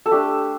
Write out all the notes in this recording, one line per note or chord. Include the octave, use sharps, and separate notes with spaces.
A4
A3 D4 G4